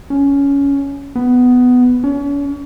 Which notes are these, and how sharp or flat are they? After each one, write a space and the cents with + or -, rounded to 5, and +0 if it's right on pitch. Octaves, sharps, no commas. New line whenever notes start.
C#4 +15
B3 +10
C#4 +40